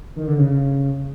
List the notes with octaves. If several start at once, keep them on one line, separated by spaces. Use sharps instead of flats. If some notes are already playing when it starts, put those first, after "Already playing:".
D#3
D3
C#3
C#3